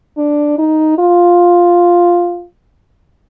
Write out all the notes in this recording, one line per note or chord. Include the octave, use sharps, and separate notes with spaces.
D4
D#4
F4